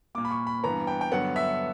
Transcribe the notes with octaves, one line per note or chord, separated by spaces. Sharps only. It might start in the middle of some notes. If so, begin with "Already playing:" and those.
A#2 A#3 D6
B5
C#6
B5
G2 E3 B3 A#5
G5
G5
G2 D3 F#3 B3 F#5
E5